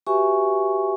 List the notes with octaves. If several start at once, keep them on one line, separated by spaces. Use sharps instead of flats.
F#4 G4 B4 E5 G#5 C#6